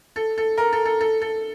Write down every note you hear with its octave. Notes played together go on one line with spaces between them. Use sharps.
A4
A4
A#4
A4
A4
A4
A4